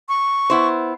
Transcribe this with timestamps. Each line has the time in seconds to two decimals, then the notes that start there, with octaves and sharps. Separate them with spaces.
0.09 C#6
0.50 B3 E4 C5